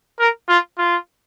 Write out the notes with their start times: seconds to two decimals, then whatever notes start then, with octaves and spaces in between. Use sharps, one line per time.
0.19 A#4
0.49 F4
0.78 F4